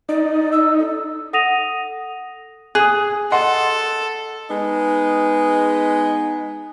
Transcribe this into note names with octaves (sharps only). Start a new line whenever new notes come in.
D#4 D5
E6
A4
A4 F#5 D#6 A#6 D#7 F7
G#4 D#6 F#6
A4 D#5 F#5 C6
G#3 B3 D#4